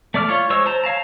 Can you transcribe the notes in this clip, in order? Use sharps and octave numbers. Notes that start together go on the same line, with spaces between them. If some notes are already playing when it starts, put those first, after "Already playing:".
A3 D5 D6 F6
F4 C#5
G#3 C5 C#5 C#6 E6
C5 A5 A#5
C#5 F5 A5 A#5